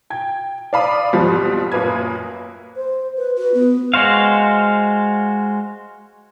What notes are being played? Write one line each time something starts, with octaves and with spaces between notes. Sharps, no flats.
G5 G#6
D5 F5 B5 D#6
F2 G#2 B2 F3 G3
F#2 A#2 A#3 B4 D#6 G#6
C5
B4
F#4 B4
B3
G#3 F#4 C5 F5